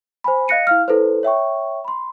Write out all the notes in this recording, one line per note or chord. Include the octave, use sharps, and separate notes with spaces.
C5 G#5 B5
D#5 F5 F#6 A#6 C#7 D#7
E4 F5 F6
E4 A4 B4 C5
C#5 E5 G5 C#6
B5 C6